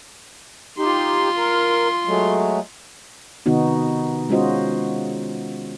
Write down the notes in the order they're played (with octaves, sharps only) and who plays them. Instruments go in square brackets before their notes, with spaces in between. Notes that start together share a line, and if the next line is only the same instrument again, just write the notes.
[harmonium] D#4 G4 [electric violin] F4 C6
[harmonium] A#4
F#3 G#3 A3
[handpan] C3 D#3 B3 D#4 F#4
G#3 C#4 F4 F#4 C5 D#5